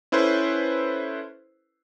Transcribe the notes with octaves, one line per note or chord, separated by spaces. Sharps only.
C#4 E4 A4 B4 C5